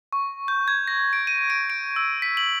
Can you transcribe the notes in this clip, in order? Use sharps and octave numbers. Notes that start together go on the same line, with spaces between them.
C#6
G6
G#6
A#6
D7
D#7
D7
D7
E6
B6
F#7